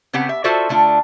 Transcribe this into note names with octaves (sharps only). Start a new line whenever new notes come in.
C#3 B3 C4 G4 F#5
E5
F4 F#4 A4 C5 D5 E5
D3 A3 D4 F4